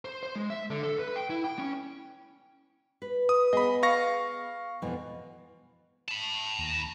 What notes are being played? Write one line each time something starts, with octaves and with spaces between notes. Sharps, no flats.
C5
C5
G#3
E5
D3
A4
B4
G5
E4
G5
C#4
B4
D#6
B3 G#4 D#5 B5
F5 C#6 A#6
F2 B2 E3
A5 B5
D#2 A#5